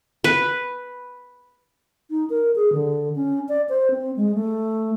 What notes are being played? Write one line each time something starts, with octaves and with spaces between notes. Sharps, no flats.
B4
D#4
A#4
G#4
D3
C#4
D5
C5
C4
G#3
A3